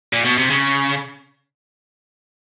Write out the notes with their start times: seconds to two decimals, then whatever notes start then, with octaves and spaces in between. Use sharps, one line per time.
0.13 A#2
0.25 B2
0.38 C3
0.50 C#3